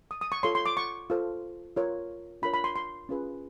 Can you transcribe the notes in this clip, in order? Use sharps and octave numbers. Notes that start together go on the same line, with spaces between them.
D#6
D#6
C#6
F4 A4 C#5 C6
C6
D6
C#6
F4 A4 C5
F4 A#4 C#5
D4 F4 A#4 C#5 B5
B5
C6
C6
C#4 F4 G#4 B4